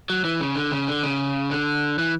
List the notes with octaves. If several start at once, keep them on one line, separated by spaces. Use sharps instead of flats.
F#3
E3
C#3
D3
C#3
D3
C#3
D3
E3